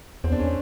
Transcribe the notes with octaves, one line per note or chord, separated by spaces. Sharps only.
E2 C4
D4
C#4